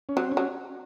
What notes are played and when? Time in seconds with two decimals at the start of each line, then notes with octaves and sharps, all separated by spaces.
0.09 C#4
0.16 F#3 C4
0.32 C#4
0.37 F#3